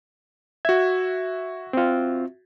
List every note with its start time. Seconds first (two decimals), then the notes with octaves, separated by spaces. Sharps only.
0.65 F#4 E5 G#6
1.73 C4 F4